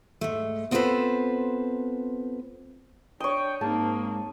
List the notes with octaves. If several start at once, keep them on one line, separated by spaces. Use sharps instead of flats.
G#2 A3
B3 C4 F4 A4 B4 C5
D4 C#5 D#5 G5
G#2 A#3 C4 A5